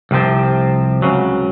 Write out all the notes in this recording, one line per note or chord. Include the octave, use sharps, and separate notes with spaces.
C2 C3 F3 C4
C#2 C#3 F#3